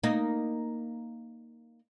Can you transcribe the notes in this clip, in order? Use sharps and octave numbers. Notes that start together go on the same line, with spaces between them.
A#3 D#4